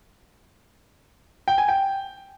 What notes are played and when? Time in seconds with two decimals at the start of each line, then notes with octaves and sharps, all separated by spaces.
1.48 G5
1.58 G#5
1.68 G5